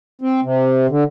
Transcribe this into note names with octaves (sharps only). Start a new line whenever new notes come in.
C4
C3
D3